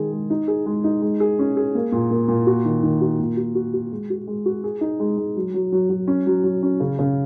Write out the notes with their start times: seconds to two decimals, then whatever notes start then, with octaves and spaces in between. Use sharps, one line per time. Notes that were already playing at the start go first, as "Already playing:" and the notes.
Already playing: D#3 G#3 G#4
0.12 G#3
0.30 D#4
0.48 G#4
0.66 G#3
0.84 D#4
1.02 G#3
1.20 G#4
1.39 C#4
1.57 G#4
1.75 A#3
1.92 A#2
2.11 A#3
2.28 A#2
2.47 F#4
2.65 D#3
2.83 D#3
3.01 F#4
3.20 A#2
3.37 F#4
3.55 F#4
3.74 F#4
3.92 G#3
4.10 F#4
4.27 G#3
4.46 F#4
4.64 G#4
4.81 D#4
5.00 G#3
5.18 G#3
5.36 F#3
5.54 F#3
5.72 F#3
5.90 F#3
6.08 C#4
6.27 F#3
6.44 F#3
6.63 C#4
6.80 C#3
6.99 C#3